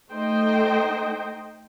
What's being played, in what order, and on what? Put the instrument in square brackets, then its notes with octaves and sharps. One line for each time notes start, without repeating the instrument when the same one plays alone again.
[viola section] A3 D#4 C5 D#5 G5